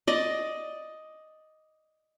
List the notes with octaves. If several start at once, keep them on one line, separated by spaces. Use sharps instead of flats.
D5 D#5